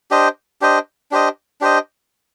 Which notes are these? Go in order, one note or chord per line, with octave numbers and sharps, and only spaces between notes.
D4 G4 C5 D#5
D4 G4 C5 D#5
D4 G4 C5 D#5
D4 G4 C5 D#5